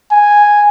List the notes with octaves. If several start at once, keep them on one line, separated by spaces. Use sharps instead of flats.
G#5